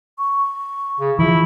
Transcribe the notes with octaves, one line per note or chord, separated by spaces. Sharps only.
C#6
C#3
E3 F3 E4